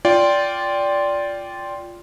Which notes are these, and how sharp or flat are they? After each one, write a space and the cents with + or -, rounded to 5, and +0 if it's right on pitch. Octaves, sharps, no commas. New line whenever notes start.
F4 +0 D5 -15 G5 +0